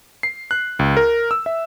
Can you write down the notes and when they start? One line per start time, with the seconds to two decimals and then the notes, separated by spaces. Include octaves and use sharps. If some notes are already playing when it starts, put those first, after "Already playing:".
0.23 C7
0.51 F#6
0.79 C#2
0.97 A#4
1.31 E6
1.46 E5